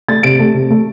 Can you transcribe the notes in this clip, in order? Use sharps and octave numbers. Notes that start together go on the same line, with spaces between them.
A3 A6
C3 D7
A3
C3
A3